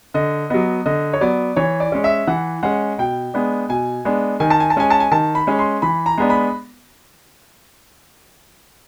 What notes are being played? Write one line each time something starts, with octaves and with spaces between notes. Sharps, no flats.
D3 D#5
F#3 B3 D#5
D3 D#5
C#5
F#3 B3 D5
E3 C#5
D5
G#3 C#4
E5
E3 F#5
G#3 C#4 F#5
B2 G5
G#3 B3 D4
B2 G#5
G#3 B3 D4
D#3 G#5
A5
G#5
A5
G#3 C#4 G#5
A5
G#5
D#3 A5
B5
G#3 C#4
C6
E3 B5
A#5
G#3 B3 D4
B5